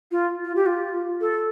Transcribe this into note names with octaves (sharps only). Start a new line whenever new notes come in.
F4
F4
G4
F4
A4